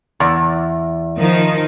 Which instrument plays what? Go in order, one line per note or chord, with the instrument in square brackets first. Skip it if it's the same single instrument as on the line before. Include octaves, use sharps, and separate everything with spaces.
[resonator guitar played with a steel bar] E2
[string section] D#3 F3 D#4